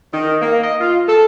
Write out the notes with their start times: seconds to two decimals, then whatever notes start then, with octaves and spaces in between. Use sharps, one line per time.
0.12 D#3
0.42 A#3
0.62 D#5
0.80 F4
1.08 A4